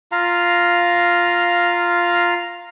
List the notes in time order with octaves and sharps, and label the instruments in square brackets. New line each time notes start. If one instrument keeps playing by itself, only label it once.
[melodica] F4 F5 A#5